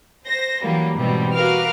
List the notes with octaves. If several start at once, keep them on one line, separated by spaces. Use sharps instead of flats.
C5 A#6
E3 F#3 G3 A#3
G#2 B2 E3 G3 C4
F#4 A#4 B4 F5 D6 F6